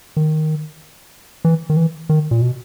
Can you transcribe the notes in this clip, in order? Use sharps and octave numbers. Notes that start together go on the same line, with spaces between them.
D#3
E3
D#3
E3
D#3
A#2
B2